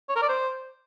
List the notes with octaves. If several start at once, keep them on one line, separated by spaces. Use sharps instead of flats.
C#5
A#4
D5
C5